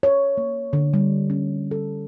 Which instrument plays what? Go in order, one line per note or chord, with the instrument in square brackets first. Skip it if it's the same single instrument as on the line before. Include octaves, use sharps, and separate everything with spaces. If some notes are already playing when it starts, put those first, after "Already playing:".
[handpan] C#5
A#3
D3
G3
C#4
A4